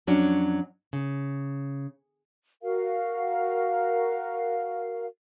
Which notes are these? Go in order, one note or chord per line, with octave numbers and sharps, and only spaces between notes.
F2 F#3 C#4 D4
C#3
F#4 A#4 F5